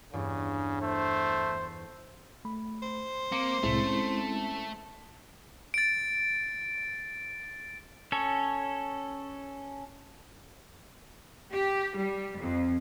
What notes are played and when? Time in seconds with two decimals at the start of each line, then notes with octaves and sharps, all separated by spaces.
0.13 E2 G2 C#3 D4
0.82 A3 C5
2.45 A3 B5
2.83 C5
3.32 A#3 C4 D6 C#7
3.63 C2 A2 C3 G#3 A3 C4 E4
3.83 C#4
5.74 A6 D7
8.12 C#4 A4 C#5
11.51 G4
11.96 G3
12.38 F2